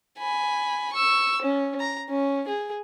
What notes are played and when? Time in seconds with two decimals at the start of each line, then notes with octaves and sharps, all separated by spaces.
0.18 G#5 B5
0.94 C#6 E6
1.42 C#4
1.80 A#5
2.09 C#4
2.48 G#4